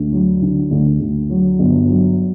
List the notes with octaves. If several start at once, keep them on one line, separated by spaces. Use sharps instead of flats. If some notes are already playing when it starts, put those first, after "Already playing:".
Already playing: D2
F#3
D3
D2
D2
F#3
G1
F#3